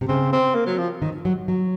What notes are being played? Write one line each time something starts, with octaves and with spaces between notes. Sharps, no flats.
C3
C#3 C4
C4
A#3
F#3
F3
D#3
F#3
F#3